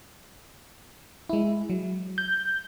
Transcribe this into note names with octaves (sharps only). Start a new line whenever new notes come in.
G#3 E4
F#3
G6